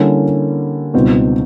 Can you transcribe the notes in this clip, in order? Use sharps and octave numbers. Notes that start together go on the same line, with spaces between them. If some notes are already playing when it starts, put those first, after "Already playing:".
Already playing: D3 G3 A#3 C#4 E4
C#2 B2 G3 C4 D#4